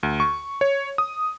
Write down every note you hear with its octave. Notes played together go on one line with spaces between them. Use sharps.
D2
C#6
C#5
D#6